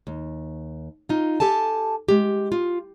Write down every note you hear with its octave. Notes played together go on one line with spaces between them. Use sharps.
D#2
D#4 F4
G4 A4 G#5 A5
G#3 G4
F4